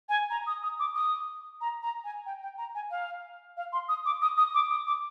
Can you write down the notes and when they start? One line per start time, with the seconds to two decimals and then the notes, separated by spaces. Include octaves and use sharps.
0.09 G#5
0.30 A#5
0.47 D#6
0.63 D#6
0.79 D6
0.95 D#6
1.61 A#5
1.83 A#5
2.04 G#5
2.26 G5
2.42 G5
2.58 A#5
2.75 G#5
2.91 F5
3.57 F5
3.73 C6
3.89 D#6
4.06 D6
4.22 D#6
4.38 D#6
4.54 D6
4.70 D#6
4.87 D6